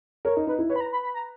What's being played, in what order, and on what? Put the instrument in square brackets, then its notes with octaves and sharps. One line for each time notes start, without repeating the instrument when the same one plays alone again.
[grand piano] A#4 [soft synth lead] C#5
[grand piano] D#4
[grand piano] D#4 [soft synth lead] B4
[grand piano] E4
[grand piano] B4 [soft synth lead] C#5
[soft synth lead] B5
A#5
B5
B5
A#5